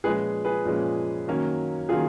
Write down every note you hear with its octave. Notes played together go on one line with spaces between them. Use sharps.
A#2 F3 G#3 C#4 G#4 B4
G#4 B4
A#2 F3 G#3 C#4
D#3 F#3 A#3 C#4
D#3 F#3 A#3 C#4 F4 G#4